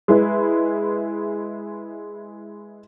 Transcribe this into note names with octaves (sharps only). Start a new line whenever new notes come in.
G#3 E4 B4